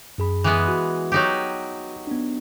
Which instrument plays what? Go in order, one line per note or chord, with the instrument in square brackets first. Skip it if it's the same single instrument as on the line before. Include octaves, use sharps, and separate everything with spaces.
[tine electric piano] F#2 G#4 B5
[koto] E3 G#3 B3
[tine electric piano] F#4
[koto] F#3 D#4 G4
[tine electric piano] B3 D4